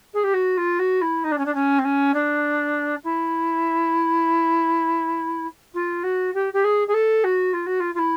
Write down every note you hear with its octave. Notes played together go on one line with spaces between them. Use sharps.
G#4
G4
F#4
F4
F#4
E4
D#4
D4
C#4
D4
C#4
C4
C#4
D4
E4
F4
F#4
G4
G4
G#4
G#4
A4
F#4
F4
F#4
F4
F4
E4